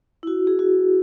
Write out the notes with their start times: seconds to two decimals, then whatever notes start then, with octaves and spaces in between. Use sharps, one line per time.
0.23 E4
0.27 F#4
0.47 G#4
0.59 F#4